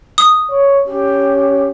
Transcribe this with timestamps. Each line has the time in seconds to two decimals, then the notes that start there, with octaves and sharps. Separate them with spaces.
0.18 D#6
0.50 C#5
0.87 C#4 G4